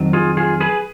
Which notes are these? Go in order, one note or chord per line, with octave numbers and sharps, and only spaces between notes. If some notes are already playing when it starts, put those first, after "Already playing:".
Already playing: F2 D#3 F#3
F4 G#4
F4 G#4
G#4 B4